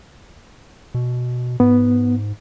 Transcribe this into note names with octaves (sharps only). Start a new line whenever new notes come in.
B2
G#2 B3